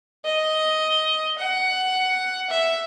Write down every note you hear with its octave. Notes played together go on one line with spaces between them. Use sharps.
D#5
F#5
E5